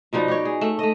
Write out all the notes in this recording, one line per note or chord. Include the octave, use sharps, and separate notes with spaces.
B2 F3 G3 D#4
G4 C#5
G#4
A3
A3 D#5